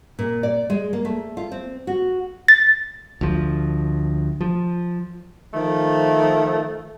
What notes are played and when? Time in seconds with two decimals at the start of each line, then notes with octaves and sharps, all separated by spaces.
0.19 A#2
0.43 D5
0.70 G#3
0.93 A#3
1.05 A3
1.37 F4
1.52 C4
1.87 F#4
2.48 A6
3.21 D2 F3
4.41 F3
5.54 D#3 F3 A3